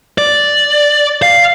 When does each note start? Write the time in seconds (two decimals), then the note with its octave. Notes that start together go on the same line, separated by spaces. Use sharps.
0.18 D5
1.22 F5